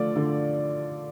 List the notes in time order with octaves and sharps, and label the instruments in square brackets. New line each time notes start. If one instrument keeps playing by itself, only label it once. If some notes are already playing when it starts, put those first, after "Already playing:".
Already playing: [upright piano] D3 F3 A3 F4 [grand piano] D5
[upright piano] D3